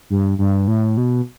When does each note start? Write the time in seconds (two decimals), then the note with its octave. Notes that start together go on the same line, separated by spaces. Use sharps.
0.10 G2
0.38 G2
0.68 A2
0.97 B2